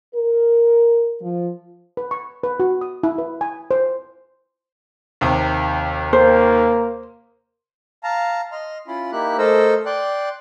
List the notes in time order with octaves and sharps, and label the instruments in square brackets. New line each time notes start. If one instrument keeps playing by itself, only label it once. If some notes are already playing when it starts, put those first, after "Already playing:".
[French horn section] A#4
F3
[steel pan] B4
C#6
B4
F#4
D#6
E4
B4
G#5
C5
[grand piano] D#2 C3
[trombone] A#3 [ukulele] C5
[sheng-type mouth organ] F5 A5 A#5
D#5 C6 F6
C#4 E4 F4 B5 C6
A#3 D#4 E4 G4 E5 F#6
A3 A4 A#4 C5 D#5 E6
D5 G5 C6 F#6